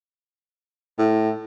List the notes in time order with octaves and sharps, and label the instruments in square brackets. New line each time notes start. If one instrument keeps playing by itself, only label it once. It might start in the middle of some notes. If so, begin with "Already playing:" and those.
[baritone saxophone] A2